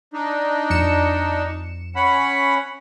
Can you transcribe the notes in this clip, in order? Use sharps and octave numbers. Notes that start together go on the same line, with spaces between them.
D4 D#4
F2 C#7 E7
C#4 F#5 B5